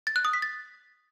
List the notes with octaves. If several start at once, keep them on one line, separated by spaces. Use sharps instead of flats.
A6
F#6
D#6
B6
A6